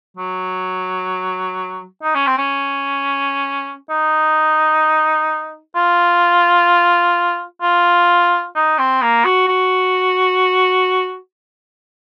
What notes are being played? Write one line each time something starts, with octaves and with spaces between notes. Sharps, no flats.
F#3
D#4
C#4
C4
C#4
D#4
F4
F4
D#4
C4
A#3
F#4
F#4